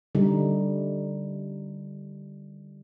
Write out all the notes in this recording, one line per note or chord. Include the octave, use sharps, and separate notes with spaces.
D3 G3 D#4